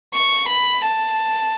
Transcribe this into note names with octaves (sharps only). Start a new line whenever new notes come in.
C#6
B5
A5